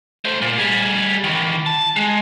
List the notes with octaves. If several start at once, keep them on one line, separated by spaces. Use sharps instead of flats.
A3 C5
A#2
G3 G#4
D#3 E3
A5
G#3